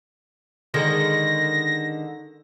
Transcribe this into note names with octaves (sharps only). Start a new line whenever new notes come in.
D3 D#3 G#3 A#6